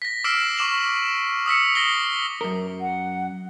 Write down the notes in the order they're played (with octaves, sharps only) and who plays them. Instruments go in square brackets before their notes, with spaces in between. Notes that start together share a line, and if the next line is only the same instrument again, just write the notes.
[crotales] A#6 B6
D6 E6 F6 C7 D7 E7
C#6 D6 E7 F#7
D#6 E6 B6 C#7
A#6 C7 G7
[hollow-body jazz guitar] F#2 A#4
[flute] F#5